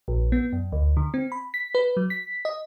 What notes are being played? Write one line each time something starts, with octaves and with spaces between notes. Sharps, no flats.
A#1
B3
F#2
D2
D3
C4
B5
B6
B4
F#3
B6
D#5